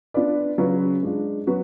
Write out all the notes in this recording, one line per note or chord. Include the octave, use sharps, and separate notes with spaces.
B3 D4 F4 B4 D5
C#3 F#3 C#4 F4 B4
G#3 D4 F4
F#3 B3 F#4 B4